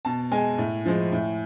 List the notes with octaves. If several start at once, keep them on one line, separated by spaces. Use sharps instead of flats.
B2 A5
G#3 G#5
A2
F3 G#3
A2